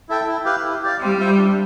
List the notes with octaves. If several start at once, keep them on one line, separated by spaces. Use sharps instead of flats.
E4 A4 E5 G5
E4
G4 B4 F5
E4
G4 D5 F5
G3 C4
F4 C5 E5
D4